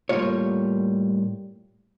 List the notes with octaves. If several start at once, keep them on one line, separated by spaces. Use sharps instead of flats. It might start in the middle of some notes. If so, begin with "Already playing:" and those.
A2 G3 A#3 F4 C#5